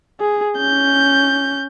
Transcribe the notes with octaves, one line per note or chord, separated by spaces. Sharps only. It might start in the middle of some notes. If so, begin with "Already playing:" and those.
G#4
C#4 G6